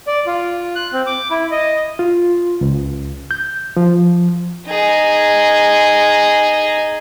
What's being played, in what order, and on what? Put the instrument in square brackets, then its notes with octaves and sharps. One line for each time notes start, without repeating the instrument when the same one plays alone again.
[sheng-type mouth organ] D5
F4
F#6
C4
D6
E4
D#5
[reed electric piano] F4
C#2
G6
F3
[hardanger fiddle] D#4 G#4